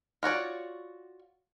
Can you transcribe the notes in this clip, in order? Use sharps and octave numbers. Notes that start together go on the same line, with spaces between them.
F4 F#4 C#5 D5